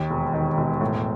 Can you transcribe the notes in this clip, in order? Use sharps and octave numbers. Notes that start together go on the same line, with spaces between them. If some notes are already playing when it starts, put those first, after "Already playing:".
Already playing: D#2
E1
D#3
E1
A2